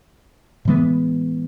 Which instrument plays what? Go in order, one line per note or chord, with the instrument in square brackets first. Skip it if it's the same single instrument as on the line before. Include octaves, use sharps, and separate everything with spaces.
[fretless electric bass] A2 E3 G#3 B3